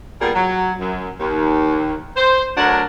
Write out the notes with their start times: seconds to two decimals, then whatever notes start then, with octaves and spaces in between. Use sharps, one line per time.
0.21 A#2 G3 A#3 B3 G#4
0.35 F#3
0.80 F#2
1.20 D#2
2.16 C5
2.57 D2 F#3 D4 A#4 F#5